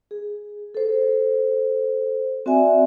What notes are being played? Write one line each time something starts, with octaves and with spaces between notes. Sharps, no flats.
G#4
A4 C5
C4 F#4 D5 E5 G#5